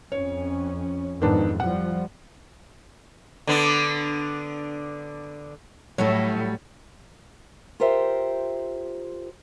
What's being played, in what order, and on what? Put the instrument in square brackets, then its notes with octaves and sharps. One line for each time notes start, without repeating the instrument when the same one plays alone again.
[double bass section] F2 C#4 [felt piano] C#5
[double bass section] F2 G#2 E3 [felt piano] D#3 B3 D4
[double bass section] F3 G3 [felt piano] F#5
[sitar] D3 B3 D4
[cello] A2 [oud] F#3 G3 A3 [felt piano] C#5
[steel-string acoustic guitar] F4 G4 A#4 C5 E5